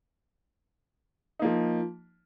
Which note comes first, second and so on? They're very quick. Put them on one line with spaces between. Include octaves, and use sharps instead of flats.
D#4 A#3 F3